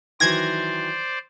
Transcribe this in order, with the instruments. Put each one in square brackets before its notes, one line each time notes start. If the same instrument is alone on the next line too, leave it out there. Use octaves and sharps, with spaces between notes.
[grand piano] D#3 E3 F#3 [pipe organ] C5 D5 [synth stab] G#6 A#6